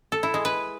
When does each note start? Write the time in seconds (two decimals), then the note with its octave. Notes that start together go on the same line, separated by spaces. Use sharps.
0.12 A4
0.23 E4
0.34 G#3
0.45 B4